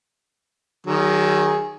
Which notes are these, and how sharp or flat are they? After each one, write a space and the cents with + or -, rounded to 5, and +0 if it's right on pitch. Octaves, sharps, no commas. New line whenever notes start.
D#3 +0 F#3 +35 G#4 +0